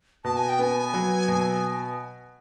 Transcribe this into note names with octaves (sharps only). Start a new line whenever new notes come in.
B2 A5
G#5
G5
B3 G#5
F#3
B2